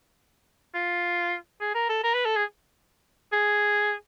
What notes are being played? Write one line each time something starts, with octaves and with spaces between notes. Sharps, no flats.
F4
G#4
A#4
A4
A#4
B4
A4
G#4
G#4